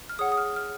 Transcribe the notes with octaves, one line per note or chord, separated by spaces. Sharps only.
F6
G#4 C#5 F#5 D#6
D#6
F6
F6